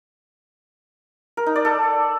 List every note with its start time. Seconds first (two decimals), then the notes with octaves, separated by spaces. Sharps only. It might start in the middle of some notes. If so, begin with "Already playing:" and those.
1.37 A#4
1.46 D#4
1.56 D5
1.65 A4